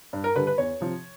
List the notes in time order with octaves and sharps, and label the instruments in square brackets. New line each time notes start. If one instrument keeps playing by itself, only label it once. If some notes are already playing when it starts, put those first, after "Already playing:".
[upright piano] G2
A#4
D3 G3 B4
B4
E2 C#5
C3 F3